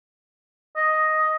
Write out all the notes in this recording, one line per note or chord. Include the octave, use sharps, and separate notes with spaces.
D#5